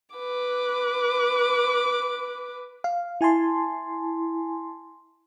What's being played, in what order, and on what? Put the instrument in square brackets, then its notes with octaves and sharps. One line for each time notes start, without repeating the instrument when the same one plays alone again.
[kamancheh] B4 D6
[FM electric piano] F5
E4 G#5 A5 C6